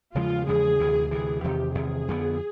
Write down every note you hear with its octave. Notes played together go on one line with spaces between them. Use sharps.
E2 C#3 F3 G#3 F4
E2 C#3 F3 G#3 G#4
D2 C3 E3
D2 C3 E3 G#4
E2 C3 D#3 G4
E2 C3 D#3 G#4
F2 D3 G3 B3